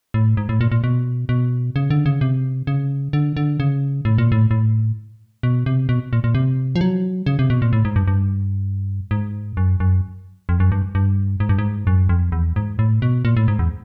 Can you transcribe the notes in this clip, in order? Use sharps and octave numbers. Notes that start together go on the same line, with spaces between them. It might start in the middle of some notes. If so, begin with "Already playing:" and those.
A2
G#2
A2
A#2
A#2
B2
B2
C#3
D3
C#3
C3
C#3
D3
D3
C#3
A2
A#2
A2
A2
B2
C3
B2
A#2
A#2
C3
F3
F#3
C#3
C3
B2
A#2
A2
G#2
G2
G2
G#2
F#2
F#2
F2
F#2
G2
G2
G#2
G2
G#2
F#2
F2
E2
G#2
A2
B2
A#2
A2
G#2
E2